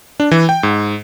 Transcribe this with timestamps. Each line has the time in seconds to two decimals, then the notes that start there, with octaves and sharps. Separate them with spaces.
0.20 D4
0.31 E3
0.49 G5
0.63 G#2